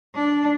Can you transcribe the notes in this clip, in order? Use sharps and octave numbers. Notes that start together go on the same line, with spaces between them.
D4